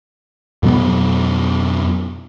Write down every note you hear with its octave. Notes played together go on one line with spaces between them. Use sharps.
F2 B2 F#3 B3